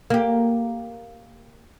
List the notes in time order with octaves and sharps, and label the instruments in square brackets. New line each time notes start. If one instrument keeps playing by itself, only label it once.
[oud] A#3 G4